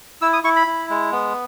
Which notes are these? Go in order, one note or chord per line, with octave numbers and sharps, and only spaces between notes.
E4 E6
D#6
E4 C#6
B5
E4
G#3
B3